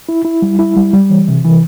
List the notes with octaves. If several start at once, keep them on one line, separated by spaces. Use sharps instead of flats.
E4
E4
G3
E4
G3
G3
E3
C3
E3